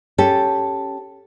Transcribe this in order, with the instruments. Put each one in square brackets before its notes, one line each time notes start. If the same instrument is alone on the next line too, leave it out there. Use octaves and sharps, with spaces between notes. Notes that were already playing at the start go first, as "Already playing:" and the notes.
[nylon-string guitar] C#4 G4 A4